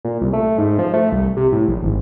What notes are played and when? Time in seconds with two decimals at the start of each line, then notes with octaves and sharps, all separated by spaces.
0.05 A#2
0.21 C2
0.33 A3
0.58 G#2
0.79 F3
0.94 A3
1.12 C2
1.37 C3
1.52 A2
1.68 A#1
1.83 G#1